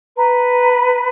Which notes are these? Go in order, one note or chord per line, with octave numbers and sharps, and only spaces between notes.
B4 A#5